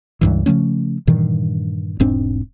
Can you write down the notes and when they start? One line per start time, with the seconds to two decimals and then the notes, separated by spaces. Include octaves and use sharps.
0.21 C#2 G2 E3
0.46 C#3 F3 A3 C#4
1.07 G2 A#2 D#3 E3
2.00 E1 G#2 C4 D4